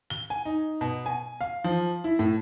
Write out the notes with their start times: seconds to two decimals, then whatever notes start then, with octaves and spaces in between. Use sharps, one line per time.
0.10 G7
0.30 G#5
0.45 D#4
0.81 B2
1.06 G#5
1.41 F5
1.64 F3
2.04 E4
2.19 A2